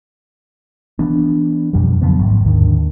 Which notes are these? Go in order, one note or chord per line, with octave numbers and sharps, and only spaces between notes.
E3 B3 D4
F2 B2 F3 G3
C#3 F3 F#3 B3
A1 G#2
D#2 G#2 D3 D#3